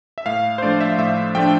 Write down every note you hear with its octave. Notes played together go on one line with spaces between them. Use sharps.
E5
A2 F5
C5
F3 A3 D4 D5
E5
A2 E5
F3 A3 D4 G5